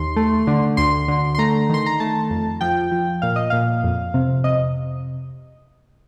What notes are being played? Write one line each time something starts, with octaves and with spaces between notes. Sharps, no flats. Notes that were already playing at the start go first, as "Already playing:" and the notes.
Already playing: D#2 C6
A3
D3
D2 C6
D3
C6
A3 A#5
D#3 C6
A#5
A3 A5
F2
F3 G5
F3
A#2 F5
D#5
A#2 F5
F2
C3
C3 D#5